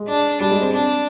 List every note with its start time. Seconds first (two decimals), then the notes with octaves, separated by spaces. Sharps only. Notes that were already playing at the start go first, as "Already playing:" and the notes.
Already playing: G#3
0.08 D4
0.40 G3 D4
0.51 G#3
0.61 C4
0.72 D4